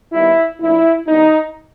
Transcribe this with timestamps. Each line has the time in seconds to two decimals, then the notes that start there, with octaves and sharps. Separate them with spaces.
0.12 D#3 G3 B3 D#4 E4
0.59 A#2 F3 A3 D4 E4
1.07 D#3 G3 B3 D4 D#4